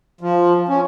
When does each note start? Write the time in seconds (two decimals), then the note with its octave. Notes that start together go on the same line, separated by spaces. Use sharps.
0.21 F3
0.69 C#4